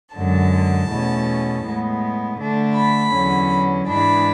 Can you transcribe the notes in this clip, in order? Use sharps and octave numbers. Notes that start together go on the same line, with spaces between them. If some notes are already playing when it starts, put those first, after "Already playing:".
F#2 D3 G#3 A5
E2 B2 A3 C#4
A2 G#3 B3
D3 A3 D4
B5
E2 D3 F#3 C#4
G#2 E3 G#3 D4 B5